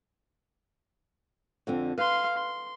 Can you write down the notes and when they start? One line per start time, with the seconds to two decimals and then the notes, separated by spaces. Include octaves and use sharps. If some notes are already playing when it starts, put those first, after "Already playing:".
1.67 F2 D3 C4
1.98 B4 F5 C6
2.37 C6